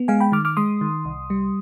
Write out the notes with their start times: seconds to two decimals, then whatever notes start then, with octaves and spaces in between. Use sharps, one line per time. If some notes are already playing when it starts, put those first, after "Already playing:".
Already playing: B3
0.08 G#3 F5 G#5
0.20 G5 B5
0.32 D#3 D6 F6
0.45 D6 F6
0.57 G#3 C6 D#6
0.81 D#3
1.05 C2
1.30 G3